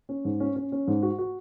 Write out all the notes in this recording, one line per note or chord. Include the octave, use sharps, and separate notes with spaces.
C#4
G#2
C#4
C#4
C#4
G#2
F#4
F#4